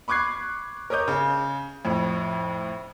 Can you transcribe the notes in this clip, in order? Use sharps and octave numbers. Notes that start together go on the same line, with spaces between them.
B5 C#6 D6 F#6 G#6 C7
A#4 C#5 D#5 D6 G6
C#3
F2 A2